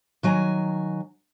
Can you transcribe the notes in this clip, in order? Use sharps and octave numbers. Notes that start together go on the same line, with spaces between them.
D#3 F#3 G#5 A#5